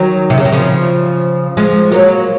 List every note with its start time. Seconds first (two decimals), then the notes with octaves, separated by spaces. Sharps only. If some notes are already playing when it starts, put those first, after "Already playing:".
Already playing: D#3 F#3
0.30 C3
0.38 C#3
0.45 D#3
0.52 C#3 F3
1.57 F3 G#3
1.92 F#3 A#3